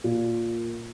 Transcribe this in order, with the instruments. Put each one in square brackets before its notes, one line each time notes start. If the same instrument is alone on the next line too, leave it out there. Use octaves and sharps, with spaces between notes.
[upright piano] A#2